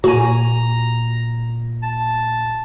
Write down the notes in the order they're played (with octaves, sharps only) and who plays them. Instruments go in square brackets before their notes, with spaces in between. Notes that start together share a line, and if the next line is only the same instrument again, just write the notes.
[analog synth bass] A#2 [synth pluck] F#4 G#5 [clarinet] A#5
[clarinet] A5